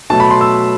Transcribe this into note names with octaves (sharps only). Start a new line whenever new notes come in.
B2 F#3 A3 A5
B5
C6
E6